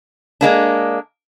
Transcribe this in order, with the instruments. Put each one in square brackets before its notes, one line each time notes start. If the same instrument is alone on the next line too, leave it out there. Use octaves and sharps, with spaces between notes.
[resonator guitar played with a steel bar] G#3 A#3 D4